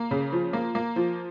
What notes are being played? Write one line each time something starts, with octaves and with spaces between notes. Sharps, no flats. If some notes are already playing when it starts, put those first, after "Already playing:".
Already playing: A#3
C#3
F3
A#3
A#3
F3